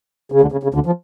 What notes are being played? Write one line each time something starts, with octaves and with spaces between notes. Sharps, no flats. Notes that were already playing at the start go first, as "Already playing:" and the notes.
C#3
D2 D3
C#3
C#3
D2 D3
F3